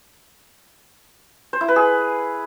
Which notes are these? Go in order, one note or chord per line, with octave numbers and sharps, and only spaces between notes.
C5
E4
B4
G#4